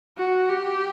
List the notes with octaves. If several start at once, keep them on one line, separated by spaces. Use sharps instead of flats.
F#4
G4